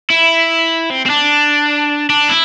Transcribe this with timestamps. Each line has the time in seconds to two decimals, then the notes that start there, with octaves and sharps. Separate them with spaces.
0.10 E4
0.90 C4
1.06 C4
1.10 D4
2.10 D4
2.30 E4